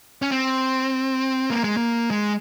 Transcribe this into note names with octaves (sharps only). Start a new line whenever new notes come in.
C#4
C4
A#3
G#3
A#3
G#3